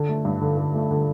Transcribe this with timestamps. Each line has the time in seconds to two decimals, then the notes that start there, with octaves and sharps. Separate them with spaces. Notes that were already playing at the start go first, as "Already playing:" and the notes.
Already playing: D3
0.09 A3
0.25 G2
0.41 D3
0.57 D3
0.74 A3
0.91 D3